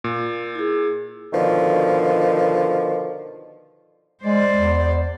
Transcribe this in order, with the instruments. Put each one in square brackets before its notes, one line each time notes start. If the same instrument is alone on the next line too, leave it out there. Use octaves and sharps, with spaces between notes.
[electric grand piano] A#2
[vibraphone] E4 G#4
[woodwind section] B2 D3 D#3 F3
[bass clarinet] G#3 [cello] C5 D5
[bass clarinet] E2